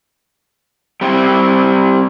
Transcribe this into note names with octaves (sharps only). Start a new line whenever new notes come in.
G3 C4 E4